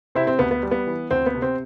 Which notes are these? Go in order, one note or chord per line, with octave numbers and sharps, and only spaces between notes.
C3 C4 E4
C4
D2 B3
B3
G3
B3
E3
D2 C4
B3
C3
C4